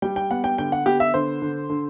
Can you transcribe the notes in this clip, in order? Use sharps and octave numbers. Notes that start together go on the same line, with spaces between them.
G3 G5
G5
B3 F#5
G5
D3 G5
F#5
B3 G4
E5
D3 C5
D3
D3